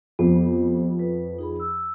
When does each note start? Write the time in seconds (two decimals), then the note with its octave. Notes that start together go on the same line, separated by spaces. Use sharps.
0.19 F2 B3 G4 C5
0.99 B4
1.39 D#4 G#4 B5
1.60 E6